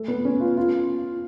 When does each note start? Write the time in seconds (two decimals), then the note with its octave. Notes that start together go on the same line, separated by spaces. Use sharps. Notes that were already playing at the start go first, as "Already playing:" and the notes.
Already playing: A3
0.08 B3
0.25 C#4
0.40 F4
0.57 F4